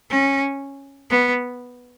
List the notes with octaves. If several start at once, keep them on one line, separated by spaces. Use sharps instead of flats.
C#4
B3